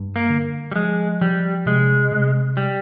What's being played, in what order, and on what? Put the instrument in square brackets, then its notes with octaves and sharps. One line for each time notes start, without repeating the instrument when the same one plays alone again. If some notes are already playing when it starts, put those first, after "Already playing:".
Already playing: [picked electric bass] G2
[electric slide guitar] A#3
[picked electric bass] D3
[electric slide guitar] G3
[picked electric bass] F3 [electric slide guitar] G#3
[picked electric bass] F3 [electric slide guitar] G3
[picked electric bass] C3 [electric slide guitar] G#3
[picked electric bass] C3
[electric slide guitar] G3